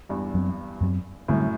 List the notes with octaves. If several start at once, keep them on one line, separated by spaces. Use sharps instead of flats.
E2 G2
F#2 F#3 A3 C4
F#2 F#3 A3 C4
F#2 A2 D3 G3 C4